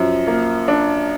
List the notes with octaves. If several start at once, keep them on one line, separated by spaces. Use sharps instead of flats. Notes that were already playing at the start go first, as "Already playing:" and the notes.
Already playing: F#2 F3
A#3
D4